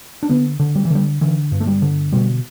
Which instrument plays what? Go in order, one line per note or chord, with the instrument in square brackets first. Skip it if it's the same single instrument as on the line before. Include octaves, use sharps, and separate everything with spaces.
[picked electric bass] D4
D3 B3
D3
G3
E3
D3 G3
D3 E3
G2
A3
G3
D3
B2 G3